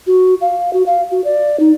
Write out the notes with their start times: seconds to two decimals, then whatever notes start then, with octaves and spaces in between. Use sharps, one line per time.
0.07 F#4
0.41 F5
0.73 F#4
0.86 F5
1.11 F#4
1.24 D5
1.60 D#4